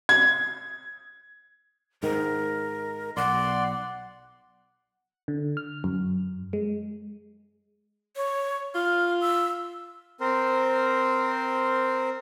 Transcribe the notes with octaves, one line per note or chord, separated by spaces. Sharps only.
G#6
G#2 D#3 A#4
B1 D5 F#5 C6
D3
F6
F#2
G#3
C#5
F4 F6
E6
C4 A#4 C5